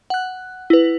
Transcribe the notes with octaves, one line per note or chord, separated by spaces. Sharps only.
F#5 F#6
E4 B4